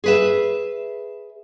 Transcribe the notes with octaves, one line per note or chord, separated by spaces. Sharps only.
G#4 B4 E5